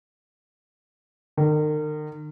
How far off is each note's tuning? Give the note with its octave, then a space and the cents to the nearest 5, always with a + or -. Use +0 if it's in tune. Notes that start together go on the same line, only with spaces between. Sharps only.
D#3 -40